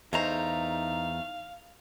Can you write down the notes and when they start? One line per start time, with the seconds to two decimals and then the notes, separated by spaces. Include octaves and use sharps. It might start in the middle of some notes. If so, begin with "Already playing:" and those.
0.13 E2 G#3 A3 D#4 C5 F5 A#5